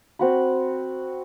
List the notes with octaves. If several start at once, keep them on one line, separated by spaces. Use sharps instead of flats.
C4 F#4 B5